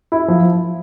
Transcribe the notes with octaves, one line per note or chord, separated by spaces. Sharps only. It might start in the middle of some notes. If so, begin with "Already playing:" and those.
E4
F3